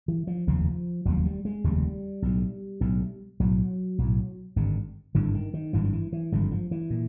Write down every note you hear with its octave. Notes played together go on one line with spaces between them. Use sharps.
E3
F3
F1 D#2 C#3 F3
F1 D#2 C#3 F#3
G3
G#3
F1 D#2 C#3 G3
B1 A2
B1 A2
B1 A2 F#3
B1 A2
G#1 G2 D3
G#1 G2 D3 E3
D#3
D#3
G#1 G2 D3 E3
F3
E3
E3
G#1 G2 D3 F3
F3
E3
A#2